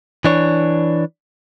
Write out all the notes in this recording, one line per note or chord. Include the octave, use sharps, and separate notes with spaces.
E3 D4 C#5